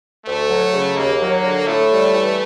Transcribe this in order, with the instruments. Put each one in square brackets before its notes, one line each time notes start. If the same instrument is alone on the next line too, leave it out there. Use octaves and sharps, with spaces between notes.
[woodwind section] D2 [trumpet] A3
[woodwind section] F#3
C#3
[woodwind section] D#2 [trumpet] A#3
[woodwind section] F#3
D3
[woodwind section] A2 [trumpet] A3
[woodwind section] G3
E3